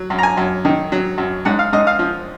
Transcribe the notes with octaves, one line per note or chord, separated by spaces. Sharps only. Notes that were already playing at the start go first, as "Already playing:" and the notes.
Already playing: F#3
F#2
A#5
G#5
F#2
D#3
F#3
F#2
G#2 F#5
F5
G#2 D#5
F5
F3